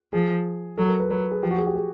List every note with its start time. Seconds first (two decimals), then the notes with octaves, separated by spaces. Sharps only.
0.13 F3 G#4
0.77 F#3 A4
0.88 A#4
1.00 B4
1.10 F#3 B4
1.31 G#4
1.43 F3 G4
1.51 F#4
1.58 G#4
1.67 G4
1.75 G#4